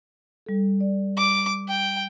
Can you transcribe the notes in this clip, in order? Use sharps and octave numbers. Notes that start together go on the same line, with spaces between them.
G3 A4
D5
D6
G5